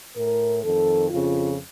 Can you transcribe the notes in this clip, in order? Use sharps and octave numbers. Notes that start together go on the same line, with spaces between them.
A2 A#4
F2 D#3 A4
F2 C#3 F4